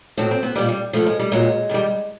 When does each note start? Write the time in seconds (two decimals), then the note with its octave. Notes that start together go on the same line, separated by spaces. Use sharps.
0.18 A2 F#3 C4
0.31 C4
0.43 B3
0.56 A#2 G3 G#3
0.69 G3
0.93 A2 F3 A3
1.06 G#3
1.19 G3
1.32 A#2 F#3 G#3
1.69 G2 D#3 G3